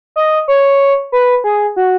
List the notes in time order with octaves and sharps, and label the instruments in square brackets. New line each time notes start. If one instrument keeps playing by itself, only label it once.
[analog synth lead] D#5
C#5
B4
G#4
F#4